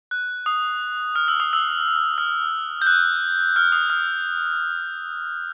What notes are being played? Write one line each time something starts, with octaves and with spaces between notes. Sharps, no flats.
F#6
D#6
F6
E6
D#6
E6
F6
G6
F#6
F6
D#6
F6